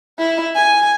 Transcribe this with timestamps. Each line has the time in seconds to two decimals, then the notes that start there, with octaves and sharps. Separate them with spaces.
0.19 E4
0.56 G#5